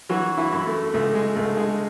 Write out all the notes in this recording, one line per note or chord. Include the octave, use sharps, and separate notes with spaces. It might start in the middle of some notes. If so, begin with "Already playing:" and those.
E3 F#3 F#4
E3 E4
F#2
A3
C#2 A3
G#3
C#2 A3
G#3